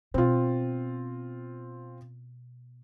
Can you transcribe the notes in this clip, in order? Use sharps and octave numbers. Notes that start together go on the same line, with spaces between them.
B2 C4 F4